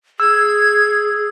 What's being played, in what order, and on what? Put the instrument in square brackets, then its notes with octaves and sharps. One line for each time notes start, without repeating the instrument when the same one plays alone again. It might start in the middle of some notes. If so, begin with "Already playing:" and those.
[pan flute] G#4 [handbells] E6 [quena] G#6